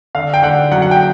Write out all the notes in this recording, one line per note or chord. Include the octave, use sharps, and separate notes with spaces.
D3 F5
G5
D3 F#5
F#2 F#5
F#5
G5